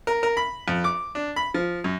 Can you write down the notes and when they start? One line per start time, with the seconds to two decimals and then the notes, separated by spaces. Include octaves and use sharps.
0.07 A#4
0.23 A#4
0.37 B5
0.68 F2
0.84 D6
1.15 D4
1.36 B5
1.54 F3
1.84 F#2